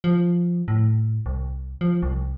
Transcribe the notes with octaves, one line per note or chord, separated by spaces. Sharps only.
F3
A2
C2
F3
C2